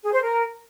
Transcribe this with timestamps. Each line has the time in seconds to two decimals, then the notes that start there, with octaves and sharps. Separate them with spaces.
0.03 G#4
0.12 C5
0.22 A#4